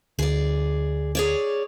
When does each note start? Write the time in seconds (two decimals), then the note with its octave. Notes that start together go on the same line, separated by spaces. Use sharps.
0.19 D2 G#4 D5
1.15 G#4 C#5 D5